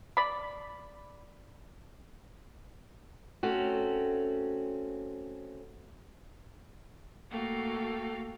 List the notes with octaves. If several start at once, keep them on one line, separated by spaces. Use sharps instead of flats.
D5 B5
A3 C4 C#4 F#4
A3 A#3 F#4 A4 F5 G5